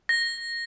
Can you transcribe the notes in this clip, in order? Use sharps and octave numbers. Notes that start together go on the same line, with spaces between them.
A#6